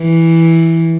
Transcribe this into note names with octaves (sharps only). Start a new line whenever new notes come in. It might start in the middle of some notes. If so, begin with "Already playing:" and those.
Already playing: E3